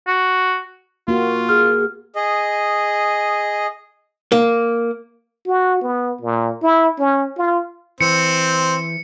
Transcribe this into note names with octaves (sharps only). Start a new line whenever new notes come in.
F#4
A#3 F4 F#4
G#4 F6
G#4 D#5
A#3
F#4
B3
A#2
E4
C#4
F4
E3 C4 C#7